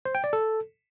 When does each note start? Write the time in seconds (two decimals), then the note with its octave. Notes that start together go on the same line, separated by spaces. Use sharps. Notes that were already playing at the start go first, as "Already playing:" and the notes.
0.05 C5
0.15 G5
0.24 D5
0.33 A4